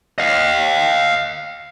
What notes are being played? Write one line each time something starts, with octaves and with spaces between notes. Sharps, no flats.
D#5 F5